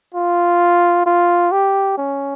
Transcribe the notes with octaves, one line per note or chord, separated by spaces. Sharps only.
F4
F4
G4
C#4